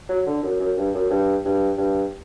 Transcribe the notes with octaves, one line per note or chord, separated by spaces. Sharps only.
F#3
D3
F#2
F#2
G2
F#2
G2
G2
G2